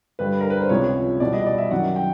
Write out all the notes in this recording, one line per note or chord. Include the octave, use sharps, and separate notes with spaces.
G2 D3 G3 B4
A#4
B4
C5
C#2 C3 F3 G#3 C#5
E2 B2 G3 D5
D#5
D5
E5
F#2 D#3 F#3 F#5
G5